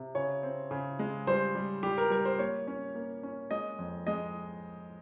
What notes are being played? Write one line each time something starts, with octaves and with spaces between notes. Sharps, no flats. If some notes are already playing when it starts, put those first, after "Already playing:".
Already playing: C3
C#3 C#5
C4
C#3
G#3
G3 C5
G3
G3 G4
A#4
G3 A#4
C5
A#3 C#5
C#4
A#3
C#4
G#3 D#5
F2
G#3 D#5